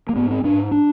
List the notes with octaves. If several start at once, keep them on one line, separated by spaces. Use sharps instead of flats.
A#3
G#2 B3
C4
G#2 D4
D4